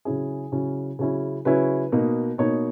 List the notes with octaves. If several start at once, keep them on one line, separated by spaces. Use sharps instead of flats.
C#3 F#3 C#4 E4 G#4
C#3 F#3 C#4 E4
C#3 F#3 C#4 E4
C#3 F#3 C#4 E4 B4
B2 A#3 D#4
B2 A#3 D#4 C#5